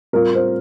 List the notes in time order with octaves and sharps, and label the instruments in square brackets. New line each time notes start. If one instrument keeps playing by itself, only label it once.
[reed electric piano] A2 G3 C4 F4 [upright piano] A#4
[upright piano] C5